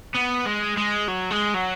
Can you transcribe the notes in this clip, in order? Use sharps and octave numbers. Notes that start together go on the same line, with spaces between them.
B3
G#3
G#3
F#3
G#3
F#3